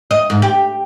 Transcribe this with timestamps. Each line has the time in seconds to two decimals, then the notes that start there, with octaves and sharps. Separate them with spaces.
0.11 D#5
0.30 G#2
0.42 G4